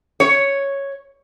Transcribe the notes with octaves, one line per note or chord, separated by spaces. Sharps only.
C#5